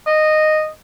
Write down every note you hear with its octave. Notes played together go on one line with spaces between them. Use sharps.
D#5